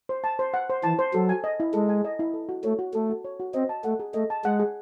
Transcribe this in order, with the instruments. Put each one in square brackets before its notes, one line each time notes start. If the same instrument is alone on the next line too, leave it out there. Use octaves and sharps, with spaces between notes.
[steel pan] C5
A5
C5
F#5
C5
[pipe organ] E3 [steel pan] A5
[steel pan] C5
[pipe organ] F#3 [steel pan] A4
[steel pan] G#5
D#5
E4
[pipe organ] G#3 [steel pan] A4
[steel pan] G#5
D#5
E4
A4
F#4
[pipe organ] A3 [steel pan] C#5
[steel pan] F#4
[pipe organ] A3 [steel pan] A4
[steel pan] F#4
C#5
F#4
[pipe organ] C4 [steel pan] D#5
[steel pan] A5
[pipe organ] A3 [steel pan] F#5
[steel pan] G#4
[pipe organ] A3 [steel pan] D#5
[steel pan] A5
[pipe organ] G#3 [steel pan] F#5
[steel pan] G#4